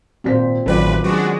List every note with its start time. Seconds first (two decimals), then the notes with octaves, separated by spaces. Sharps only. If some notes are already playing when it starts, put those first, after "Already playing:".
0.24 G#1 A#2 C4 C5 B6
0.66 A1 D#3 F#3 F4 A4 B4 D5
1.04 F#3 G#3 D4 F#4